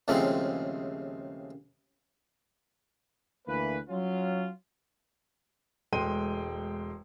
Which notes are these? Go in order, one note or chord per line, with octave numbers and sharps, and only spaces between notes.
D#2 A2 C#3 F3 G#3 C4
D2 E3 A#3 B4
F#3 C#4 F4
E1 G#3 A3 G5 C6 D#7